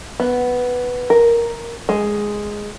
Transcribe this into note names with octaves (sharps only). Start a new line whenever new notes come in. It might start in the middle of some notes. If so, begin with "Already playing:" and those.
B3
A#4
G#3